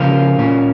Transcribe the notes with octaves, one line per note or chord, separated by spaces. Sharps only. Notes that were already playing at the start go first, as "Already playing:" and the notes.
Already playing: C#3 F3 A#3 C#4 F4 A#4
A#2 A#3 C#4